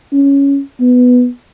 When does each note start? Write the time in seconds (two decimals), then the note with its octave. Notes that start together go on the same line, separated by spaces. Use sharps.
0.12 C#4
0.80 B3